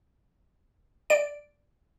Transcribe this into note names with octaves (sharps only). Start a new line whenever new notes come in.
D5 D7